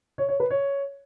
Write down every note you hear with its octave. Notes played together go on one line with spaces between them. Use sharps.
C#5
C#5
B4
C#5